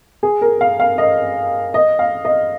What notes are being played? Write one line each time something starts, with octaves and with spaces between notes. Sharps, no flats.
G#4
A#4
F5
F5
D#5
D#5
F5
D#5